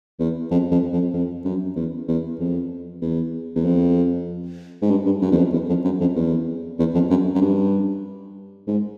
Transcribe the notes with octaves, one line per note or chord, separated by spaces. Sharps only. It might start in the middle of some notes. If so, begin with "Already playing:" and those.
E2
F2
F2
F2
F2
F#2
E2
E2
F2
E2
E2
F2
G#2
G2
G2
F#2
E2
F2
E2
F2
F#2
F2
E2
E2
F2
F#2
F#2
G2
G#2